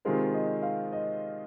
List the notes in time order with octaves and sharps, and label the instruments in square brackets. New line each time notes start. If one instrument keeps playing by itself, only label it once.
[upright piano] C3 D#3 G#3 F4 [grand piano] C5
[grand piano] D#5
F5
D#5